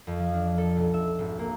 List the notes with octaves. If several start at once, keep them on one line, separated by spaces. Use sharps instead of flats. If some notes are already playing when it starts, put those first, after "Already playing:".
F2
F3
D4
A4
B1
E5
G#1
A#3